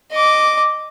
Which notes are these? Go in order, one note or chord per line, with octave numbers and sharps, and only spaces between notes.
D#5 D6